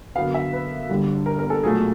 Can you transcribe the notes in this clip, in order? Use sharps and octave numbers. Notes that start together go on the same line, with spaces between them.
F#2 D3 F#3 B3 F5
E5
B4
G1 G2 D3 G3
A#4
A#4
A4
B1 A#2 F#3 A3 G#4